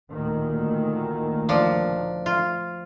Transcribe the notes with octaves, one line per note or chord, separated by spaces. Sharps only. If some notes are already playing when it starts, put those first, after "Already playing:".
D2 A#2 D#3
F3 D4
F4